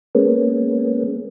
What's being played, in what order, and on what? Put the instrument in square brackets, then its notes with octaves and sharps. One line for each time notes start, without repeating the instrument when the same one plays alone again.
[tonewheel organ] G#3 A#3 B3 C#4